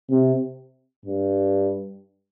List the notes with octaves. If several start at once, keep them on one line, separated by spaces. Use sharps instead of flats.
C3
G2